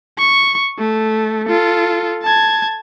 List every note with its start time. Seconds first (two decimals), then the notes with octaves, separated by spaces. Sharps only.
0.18 C#6
0.78 A3
1.47 F4 A4
2.23 A5 G#6